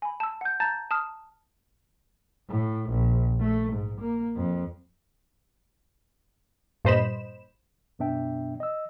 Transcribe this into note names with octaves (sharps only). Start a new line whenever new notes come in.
G#5 B5
A5 E6
F#5 G6
A5 A#5 G6 A6
A5 D#6 F6
A2
A#1
A3
G#2
A#3
F2
G2 A#2 C5 D#5 B5 E7
F#2 B2 B3 D4 E5 G5
D#5 E6